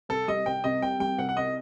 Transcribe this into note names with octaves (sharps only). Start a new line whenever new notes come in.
C2 A4
G3 D#5
C2 G5
C3 D#5
C2 G5
G3 G5
C2 F#5
F#5
C3 D#5